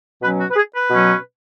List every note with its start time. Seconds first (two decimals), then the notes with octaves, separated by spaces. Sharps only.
0.22 B2 F#3 C#4 B4
0.39 F#4
0.51 B4
0.56 G#4
0.72 B4
0.90 B2 F#3 C#4